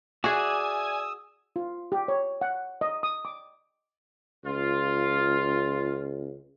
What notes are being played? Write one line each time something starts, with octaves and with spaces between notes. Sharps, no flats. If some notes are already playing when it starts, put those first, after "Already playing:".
F#4 G#4 D5 E5 G#5 D#6 E6
F4
G4
C#5
F#5
D#5
D#6
D6
C#2 F4